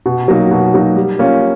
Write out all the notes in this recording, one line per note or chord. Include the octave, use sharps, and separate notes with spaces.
B2
F#3 A#3 D#4
B2
F#3 A#3 D#4
G3
A#3 C#4 F4